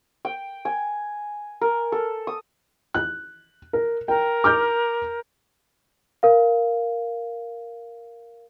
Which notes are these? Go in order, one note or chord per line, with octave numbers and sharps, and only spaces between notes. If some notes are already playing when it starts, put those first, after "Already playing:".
G5
G#5
A#4
A4
D#6
F#6
A#4
A#4 G5
D6 F6 G6
A#4 F5